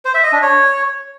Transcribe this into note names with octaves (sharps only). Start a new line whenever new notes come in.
C5
E5
D#5
D4
C#5